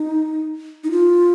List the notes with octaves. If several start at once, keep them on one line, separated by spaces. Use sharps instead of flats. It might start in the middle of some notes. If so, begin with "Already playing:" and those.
Already playing: D#4
D#4
F4